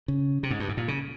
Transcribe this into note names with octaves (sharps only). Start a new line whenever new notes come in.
C#3
C3
G#2
G2
G#2
A#2
C#3